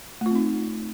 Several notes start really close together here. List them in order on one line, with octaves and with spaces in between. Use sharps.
A3 F4 C4 D#4